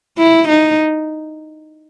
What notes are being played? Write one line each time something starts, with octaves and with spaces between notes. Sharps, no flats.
E4
D#4